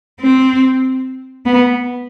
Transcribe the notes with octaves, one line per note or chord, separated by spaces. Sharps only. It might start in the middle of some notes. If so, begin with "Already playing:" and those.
C4
B3